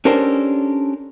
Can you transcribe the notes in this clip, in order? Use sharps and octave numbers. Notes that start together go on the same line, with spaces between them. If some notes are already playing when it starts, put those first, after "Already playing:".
C#4 D4 G4 A4 A#4 C5